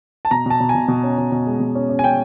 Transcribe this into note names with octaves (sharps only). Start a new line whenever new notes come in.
A5
B2 A#5
B2 A5
B2
G#5
B2
B2
C#4
B2
B2
G#3
B2
C#4
C#4
G#5
C#4 G5